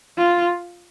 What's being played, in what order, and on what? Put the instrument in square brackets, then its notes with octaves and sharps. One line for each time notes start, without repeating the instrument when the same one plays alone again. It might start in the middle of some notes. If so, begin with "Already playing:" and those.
[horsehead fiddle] F4